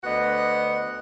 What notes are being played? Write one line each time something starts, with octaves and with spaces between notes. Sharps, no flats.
D2 B3 D#5 F#5